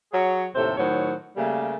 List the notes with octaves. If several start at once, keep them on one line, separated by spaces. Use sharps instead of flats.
F#3 G#4 C#5
D#2 A2 C3 A4 C5
A2 D#3 F#3 C5 C#5
C#3 G3 A3 A#3